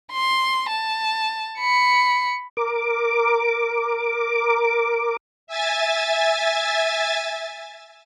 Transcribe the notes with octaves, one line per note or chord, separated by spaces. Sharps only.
C6
A5
B5 C#7
A#4 D6
E5 G#5 A6